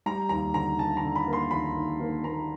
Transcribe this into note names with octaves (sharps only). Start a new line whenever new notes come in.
G3 A#5
D#2 A#5
D3 A#5
D3 A5
A#5
D3
B5
A#3
C6
D#2 B5
D#2
A#3
A#3 A#5